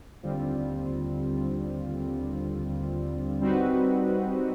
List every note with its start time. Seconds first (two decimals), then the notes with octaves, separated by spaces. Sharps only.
0.23 D#2 D3 G3 C4 F4
3.41 G3 C4 D#4 F#4 B4